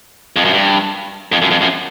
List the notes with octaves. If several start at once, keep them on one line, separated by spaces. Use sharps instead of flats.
F2
F#2
G2
F2
F#2
F2
F#2